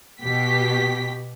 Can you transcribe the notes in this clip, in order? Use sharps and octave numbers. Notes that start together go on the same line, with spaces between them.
B2 G4 B6